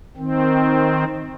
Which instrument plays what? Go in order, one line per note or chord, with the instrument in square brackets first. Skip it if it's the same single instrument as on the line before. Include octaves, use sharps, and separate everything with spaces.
[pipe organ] D#3 C4